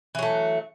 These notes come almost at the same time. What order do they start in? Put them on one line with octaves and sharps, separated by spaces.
E3 F#3 A3